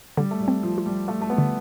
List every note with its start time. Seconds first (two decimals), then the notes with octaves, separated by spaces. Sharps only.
0.17 D3 G3
0.31 A3
0.40 G3
0.48 C4
0.63 F3
0.78 F4
0.86 G3
1.08 A3 F4
1.21 A3
1.30 B3
1.38 D3